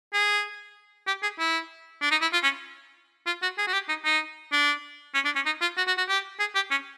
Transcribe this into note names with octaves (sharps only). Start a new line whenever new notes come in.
G#4
G4
G#4
E4
D4
D#4
E4
F4
C#4
F4
F#4
G#4
F#4
G4
D#4
D#4
D4
C#4
D4
C#4
D#4
F4
F#4
F#4
F#4
G4
G#4
G4
C#4